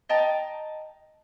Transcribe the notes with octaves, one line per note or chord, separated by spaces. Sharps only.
D#5 G5 A5 A#5